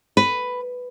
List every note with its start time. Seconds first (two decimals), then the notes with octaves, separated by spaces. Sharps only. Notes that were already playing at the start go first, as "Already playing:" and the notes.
0.17 B4